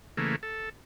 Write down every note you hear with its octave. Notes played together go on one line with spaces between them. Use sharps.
C#3 E3 A3 A#3
A4